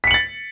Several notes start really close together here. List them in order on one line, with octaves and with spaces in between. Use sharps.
B6 C#7 F#7 A6